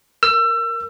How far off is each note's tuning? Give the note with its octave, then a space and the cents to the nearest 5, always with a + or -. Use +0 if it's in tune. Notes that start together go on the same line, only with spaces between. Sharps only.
A#4 +0 E6 +30